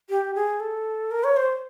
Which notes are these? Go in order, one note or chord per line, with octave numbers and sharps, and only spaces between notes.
G4
G#4
A4
A#4
C#5
C5